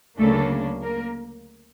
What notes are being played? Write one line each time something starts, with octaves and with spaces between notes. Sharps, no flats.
D2 C#3 F#3 A3 A#3 D4 A4
A#3 A#4